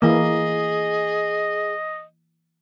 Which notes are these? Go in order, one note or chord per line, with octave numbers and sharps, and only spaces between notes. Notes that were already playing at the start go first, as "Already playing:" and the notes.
E3 A#3 G#4 D#5